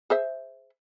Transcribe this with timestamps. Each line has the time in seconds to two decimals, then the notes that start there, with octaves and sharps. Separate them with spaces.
0.10 G#4 C5 E5